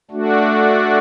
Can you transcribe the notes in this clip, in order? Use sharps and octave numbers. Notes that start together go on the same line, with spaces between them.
A3 D4 F#4